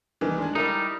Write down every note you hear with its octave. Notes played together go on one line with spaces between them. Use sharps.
C2 D#3 E3
G#3 D4 G#4
G3 D#4 E4 A#4